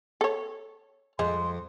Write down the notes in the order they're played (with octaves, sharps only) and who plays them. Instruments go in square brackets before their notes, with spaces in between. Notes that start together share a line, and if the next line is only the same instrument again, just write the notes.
[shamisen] A4 C#5
[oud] F2 [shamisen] G#3 [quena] C6